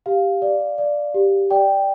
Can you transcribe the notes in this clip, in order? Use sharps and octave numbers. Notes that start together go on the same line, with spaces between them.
G4 F5
D5
D5
G4
D5 G5